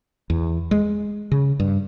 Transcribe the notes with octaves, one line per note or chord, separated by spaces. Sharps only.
E2
G#3
C#3
G2